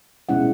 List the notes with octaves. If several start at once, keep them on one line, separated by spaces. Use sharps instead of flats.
B2 G#3 C#4 E4 F#5